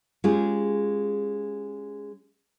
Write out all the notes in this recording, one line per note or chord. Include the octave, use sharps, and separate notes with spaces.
G#3 C#4 F4 G4 G#4